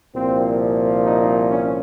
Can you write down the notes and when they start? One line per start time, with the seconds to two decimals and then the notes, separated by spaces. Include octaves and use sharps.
0.15 C2 A#2 F3 C4
1.05 D#4
1.50 C#4